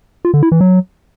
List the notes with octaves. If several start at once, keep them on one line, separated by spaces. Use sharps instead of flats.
F4
D3
E4
E3
F#3